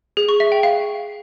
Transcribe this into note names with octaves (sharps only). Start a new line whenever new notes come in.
G#4
C#6
E5
G5
F5